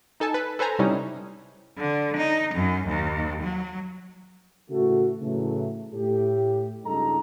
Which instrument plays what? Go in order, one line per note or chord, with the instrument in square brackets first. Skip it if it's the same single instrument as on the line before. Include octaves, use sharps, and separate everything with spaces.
[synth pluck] D#4 A4 G#5 A5
B4
A4 B4 C5 G#5 A#5
C3 G3 C#4 D#4 E4
[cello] D3
D#4
F#2
D#2
F#3
[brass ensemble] A2 C#3 E3 A3 F#4
A2 C#3 E3 F#3 A3
A2 G4
C#2 G2 G#3 D#4 A4 A#5